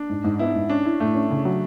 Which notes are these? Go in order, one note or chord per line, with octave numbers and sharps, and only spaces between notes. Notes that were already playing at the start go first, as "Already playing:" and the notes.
Already playing: D4
G#2
G#2
B3 E4
G#2
C#4 D4
E4
A2 A3
C#4
C#3
F#3